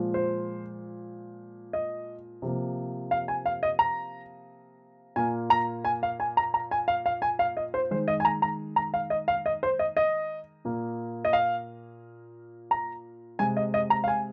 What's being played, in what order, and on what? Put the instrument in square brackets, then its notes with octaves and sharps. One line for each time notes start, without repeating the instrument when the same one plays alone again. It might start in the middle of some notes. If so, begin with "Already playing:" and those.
Already playing: [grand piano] A#2 F3 G#3
C5
D#5
C3 F3 A#3
F5
G#5
F5
D#5
A#5
A#2 A#3 G#5
A#5
G#5
F5
G#5
A#5
A#5
G#5
F5
F5
G#5
F5
D#5
C5
D#3 G#3 C5
D#5
G#5
A#5
A#5
A#5
F5
D#5
F5
D#5
C5
D#5
D#5
A#2 A#3
D#5
F5
A#5
C3 G#3 G#5
D#5
D#5
A#5
F5
G#5